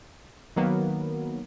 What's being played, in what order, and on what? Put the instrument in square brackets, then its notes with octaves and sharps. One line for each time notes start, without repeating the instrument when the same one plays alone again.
[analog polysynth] D#3 F#3 A#3 B3